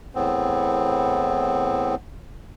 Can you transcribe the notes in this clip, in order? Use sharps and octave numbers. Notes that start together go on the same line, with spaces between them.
E2 A2 B3 C4